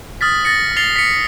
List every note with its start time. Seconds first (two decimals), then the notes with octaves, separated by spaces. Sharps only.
0.21 D#6 F6 A6 B6
0.45 A6 A#6 C#7
0.77 A6 C7 F7 G7
0.96 B6 C#7